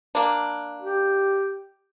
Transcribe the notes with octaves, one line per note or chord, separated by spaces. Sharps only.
A#3 D4
G4